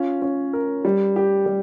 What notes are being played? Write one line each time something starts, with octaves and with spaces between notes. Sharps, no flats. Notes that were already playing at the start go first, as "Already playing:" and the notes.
Already playing: C#4 F4
C#4
A#4
G3
G4
G3